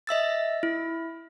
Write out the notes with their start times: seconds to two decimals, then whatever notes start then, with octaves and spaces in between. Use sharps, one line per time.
0.07 D#5 E5 E6 A6
0.63 E4